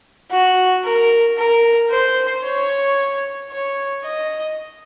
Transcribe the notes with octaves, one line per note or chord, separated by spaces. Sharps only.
F#4
A#4
A#4
C5
C#5
C#5
D#5